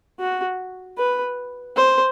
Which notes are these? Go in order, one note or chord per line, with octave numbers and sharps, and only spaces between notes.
F#4
B4
C5